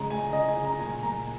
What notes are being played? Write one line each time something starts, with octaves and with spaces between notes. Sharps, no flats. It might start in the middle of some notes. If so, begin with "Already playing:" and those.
Already playing: C#3 G#3 A#5
G#3 G#5
C#3 D#5
G#5
C#3
A#5
A#2 G#5
A#2 A#5